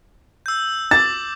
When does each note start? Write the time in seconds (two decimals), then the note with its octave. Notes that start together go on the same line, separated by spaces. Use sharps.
0.46 E6 G6
0.91 D6 A6